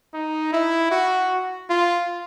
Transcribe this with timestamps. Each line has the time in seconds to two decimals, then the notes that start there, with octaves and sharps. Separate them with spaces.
0.14 D#4
0.53 E4
0.91 F#4
1.70 F4